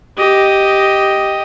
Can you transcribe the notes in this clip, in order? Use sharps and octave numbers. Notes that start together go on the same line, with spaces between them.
G4 D#5